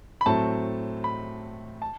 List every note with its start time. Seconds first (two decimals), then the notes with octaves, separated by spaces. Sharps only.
0.21 B5
0.26 A2 F#3 A3 C4 A5
1.04 B5
1.82 A5